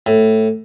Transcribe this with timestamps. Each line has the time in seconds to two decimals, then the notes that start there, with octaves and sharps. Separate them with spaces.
0.06 A2